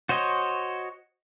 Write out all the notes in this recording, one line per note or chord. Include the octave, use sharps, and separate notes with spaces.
F#4 C5 C#5 D#5